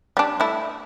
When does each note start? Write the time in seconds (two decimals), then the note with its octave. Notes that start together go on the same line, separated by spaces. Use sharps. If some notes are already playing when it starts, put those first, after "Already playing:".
0.17 G3 D4
0.40 A3 E4